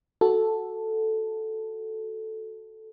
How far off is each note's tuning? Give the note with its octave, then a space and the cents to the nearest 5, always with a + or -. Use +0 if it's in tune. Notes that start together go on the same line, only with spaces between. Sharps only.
F#4 +0 A4 +0